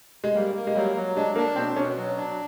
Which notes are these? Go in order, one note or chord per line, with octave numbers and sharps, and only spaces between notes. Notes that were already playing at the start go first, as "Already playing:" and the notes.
G#3
G3 A#3
A#3
G#3
F#3 G3
F#3
G#3 D4
A#3 D4
B2 C4
B2 C#4
F#3
D4